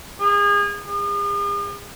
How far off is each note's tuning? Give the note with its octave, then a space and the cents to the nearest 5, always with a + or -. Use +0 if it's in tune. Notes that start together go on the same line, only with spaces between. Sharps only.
G#4 -30
G#4 -45